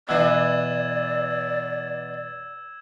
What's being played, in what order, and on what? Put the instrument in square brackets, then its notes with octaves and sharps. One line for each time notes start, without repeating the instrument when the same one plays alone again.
[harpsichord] B2 E3 [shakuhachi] D5 [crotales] E6 G#6 E7